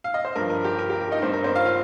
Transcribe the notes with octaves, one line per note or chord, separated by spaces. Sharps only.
F5
D#5
C5
G2 F3 A#4
A#4
G4
A#4
G4
A#4
D#4 D#5
G2 G3 C4 C5
A#4
C4 C5
F4 F5
F4 F5